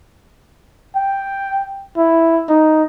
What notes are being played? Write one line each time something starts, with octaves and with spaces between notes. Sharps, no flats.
G5
E4
D#4